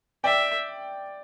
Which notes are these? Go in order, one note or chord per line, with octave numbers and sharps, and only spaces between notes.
D5 E5 G5